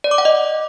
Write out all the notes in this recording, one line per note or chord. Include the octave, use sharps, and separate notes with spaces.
D5
D6
F#5
D#5